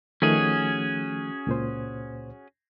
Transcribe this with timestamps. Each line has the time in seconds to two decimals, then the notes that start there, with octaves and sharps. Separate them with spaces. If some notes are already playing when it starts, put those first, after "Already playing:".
0.22 D#3 F3 A3 C#4 F#4 G#4
1.47 C#2 A#2 C5